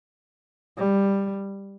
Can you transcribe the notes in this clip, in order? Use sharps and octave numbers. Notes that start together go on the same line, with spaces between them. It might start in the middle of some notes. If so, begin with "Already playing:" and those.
G3